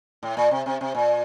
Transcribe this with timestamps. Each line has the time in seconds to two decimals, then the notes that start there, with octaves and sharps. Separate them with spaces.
0.23 A2
0.37 A#2
0.51 C3
0.66 C3
0.81 C3
0.95 A#2